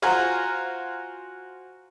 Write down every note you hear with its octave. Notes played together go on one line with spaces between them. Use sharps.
F4 F#4 C5 F5 G#5 A#5